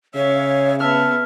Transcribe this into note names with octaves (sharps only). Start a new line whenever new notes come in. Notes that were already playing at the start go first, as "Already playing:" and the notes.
C#3 C#5 E5 F5
B3 E5 A5 F6